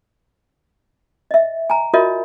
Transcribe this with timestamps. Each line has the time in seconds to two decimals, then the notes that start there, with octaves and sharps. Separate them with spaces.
1.31 D#5 E5
1.70 G#5 A#5
1.94 F4 F#4 A#4 C#5 D#5 E5